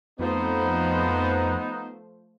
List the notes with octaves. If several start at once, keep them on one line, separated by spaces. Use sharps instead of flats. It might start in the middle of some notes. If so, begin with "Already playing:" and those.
F2 F3 A3 B3 D#4 C5